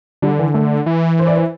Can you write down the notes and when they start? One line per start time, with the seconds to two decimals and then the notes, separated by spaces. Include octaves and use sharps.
0.22 D3 G3
0.38 E3
0.54 A3
0.86 E3
1.19 C5
1.27 D5
1.35 C5